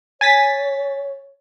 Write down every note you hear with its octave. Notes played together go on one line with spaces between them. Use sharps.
C#5 G#5 A6 B6